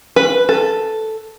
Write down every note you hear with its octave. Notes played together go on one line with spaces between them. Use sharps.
B4
A4